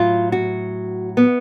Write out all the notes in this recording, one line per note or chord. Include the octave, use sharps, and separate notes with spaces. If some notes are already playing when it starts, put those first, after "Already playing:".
Already playing: A2 F#3 F4
F#4
B3